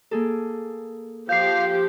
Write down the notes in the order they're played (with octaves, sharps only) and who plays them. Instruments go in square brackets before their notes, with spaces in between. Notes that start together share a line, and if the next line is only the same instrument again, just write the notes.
[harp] A#3 G#4 A4
[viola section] F3 G4 [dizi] F5 [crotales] G6 C7